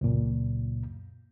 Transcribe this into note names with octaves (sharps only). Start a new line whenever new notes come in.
C#2 F#2 A#2